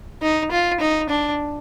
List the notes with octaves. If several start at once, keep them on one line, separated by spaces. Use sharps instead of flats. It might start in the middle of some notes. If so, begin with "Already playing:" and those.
D#4
F4
D#4
D4